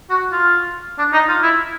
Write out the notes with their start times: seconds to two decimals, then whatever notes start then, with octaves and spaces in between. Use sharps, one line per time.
0.10 F#4
0.32 F4
0.98 D4
1.13 D#4
1.28 F4
1.43 E4